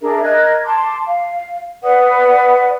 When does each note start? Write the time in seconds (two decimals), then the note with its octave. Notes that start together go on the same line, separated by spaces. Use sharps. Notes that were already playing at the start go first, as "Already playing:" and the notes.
0.01 D4 G#4 A#4 E5
0.23 A#4 D#5 F#6 G#6
0.65 A5 C6 D6
1.06 F5
1.83 B4 D5 F#5 D#6